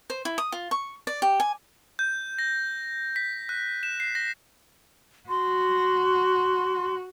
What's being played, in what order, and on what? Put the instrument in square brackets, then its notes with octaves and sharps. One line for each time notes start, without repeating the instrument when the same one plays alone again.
[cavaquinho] C5
E4
D#6
F4
C#6
D5
G4
G#5
[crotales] G6
A#6
B6
F#6
E7
C7
A#6
[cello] F#4 [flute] C6